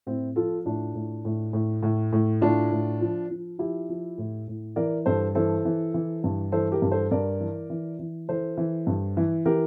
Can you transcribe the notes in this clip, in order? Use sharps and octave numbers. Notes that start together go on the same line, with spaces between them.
A2 C4 E4
F3 F4 A4
A2 D4 F4
A2
A2
A2
A2
A2
A2 D4 F4
A2
F3
F3
F3 E4 G4
F3
A2
A2
E3 A#4 D5
G2 A4 C5
E3 A4 C5
E3
E3
G2
E3 A4 C5
G4 A#4
G2
A4 C5
G2 A#4 D5
E3
E3
E3
E3 A4 C5
E3
G2
E3
E3 G4 A#4